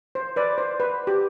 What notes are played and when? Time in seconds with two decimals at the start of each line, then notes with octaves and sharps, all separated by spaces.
0.15 C5
0.36 B4 D5
0.58 C5
0.80 B4
1.07 G4